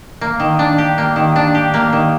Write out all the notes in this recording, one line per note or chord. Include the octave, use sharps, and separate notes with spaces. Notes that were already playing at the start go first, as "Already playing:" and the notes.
A#3
D#3
D4
G4
A#3
D#3
D4
G4
A#3
D#3